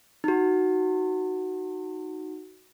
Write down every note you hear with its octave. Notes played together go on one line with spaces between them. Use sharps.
D#4 F#4